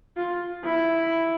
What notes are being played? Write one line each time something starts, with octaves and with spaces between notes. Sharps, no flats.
F4
E4